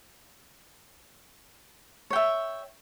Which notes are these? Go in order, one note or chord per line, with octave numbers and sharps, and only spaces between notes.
C#5 E5 G5